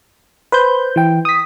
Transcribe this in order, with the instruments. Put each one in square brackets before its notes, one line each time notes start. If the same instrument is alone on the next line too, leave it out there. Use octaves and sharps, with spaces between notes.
[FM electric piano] B4 C5 G6
E3 G5
D#6 B6